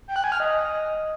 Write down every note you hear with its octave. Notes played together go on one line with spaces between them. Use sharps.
G5
F#6
G#5
F6
D#5